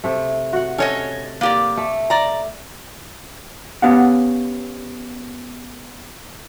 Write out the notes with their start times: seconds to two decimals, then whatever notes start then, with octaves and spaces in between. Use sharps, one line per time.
0.04 C3 A3
0.53 F#4 F#5
0.78 C#4 A4 C#5 D#5
1.41 A#3 G4 D5
1.77 A3
2.10 D5 A#5
3.82 B3 C#4 G4 F5 F#5